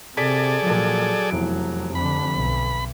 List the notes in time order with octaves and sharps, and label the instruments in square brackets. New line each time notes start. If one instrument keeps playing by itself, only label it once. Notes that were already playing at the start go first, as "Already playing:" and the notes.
[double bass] C3 [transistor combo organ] G#4 A4 D5 [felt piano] B6
[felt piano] A#2 F3 [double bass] F#3
[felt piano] F1 E2 D7
[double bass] F2 D3 [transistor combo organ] B5
[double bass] B1